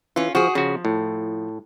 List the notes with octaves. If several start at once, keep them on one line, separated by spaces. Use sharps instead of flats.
E3 C#4 F4
F3 F#4 G#4
C#3 F3 F#4
A2